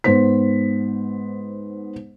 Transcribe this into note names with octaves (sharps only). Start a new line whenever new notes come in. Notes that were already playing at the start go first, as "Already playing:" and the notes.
G#2 B3 C5 B6